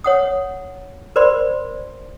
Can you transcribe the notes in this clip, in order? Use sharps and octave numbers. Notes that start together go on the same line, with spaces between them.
C#5 F#5 D#6
A#4 C5 D5 B5 C6